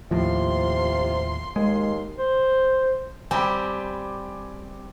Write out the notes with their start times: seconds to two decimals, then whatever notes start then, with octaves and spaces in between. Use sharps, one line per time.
0.11 D#2 A2 C3 F3 F4 C6
1.56 D#2 G#3 C6
2.18 C5
3.31 G3 C4 G4 G#5 B5 D6